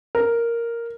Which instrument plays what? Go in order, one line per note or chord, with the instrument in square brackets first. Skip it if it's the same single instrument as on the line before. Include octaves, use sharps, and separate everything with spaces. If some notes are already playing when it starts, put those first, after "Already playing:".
[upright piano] A#4